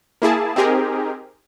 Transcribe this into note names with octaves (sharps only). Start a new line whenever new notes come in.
A#3 E4 G#4 A5
C4 D#4 G4 G#4 A#4